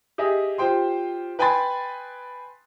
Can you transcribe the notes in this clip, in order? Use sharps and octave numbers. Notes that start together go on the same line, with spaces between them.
G4 G#4 D#5 E5
F4 G4 C5 G5 C6
B4 G5 G#5 B5 C6 A6